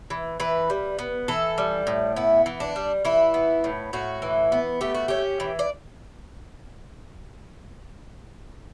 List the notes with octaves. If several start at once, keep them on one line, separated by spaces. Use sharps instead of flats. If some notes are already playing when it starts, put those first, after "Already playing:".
E3
E3 B4
G3
B3
E3 A4
G3
A2
B3 E4
E3
D4
G3
E3 E4
B3
A2
A2 F#4
E3
B3
A3 G4
F#4
C#4 G4
E3
D5